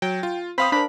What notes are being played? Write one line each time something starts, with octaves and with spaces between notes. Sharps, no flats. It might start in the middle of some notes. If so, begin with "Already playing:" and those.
F#3 G5
F4
C4 C5 F5 B5 D#6
D4 A#4 B5